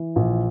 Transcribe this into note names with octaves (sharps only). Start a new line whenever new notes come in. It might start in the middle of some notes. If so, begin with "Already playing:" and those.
Already playing: E3
A#1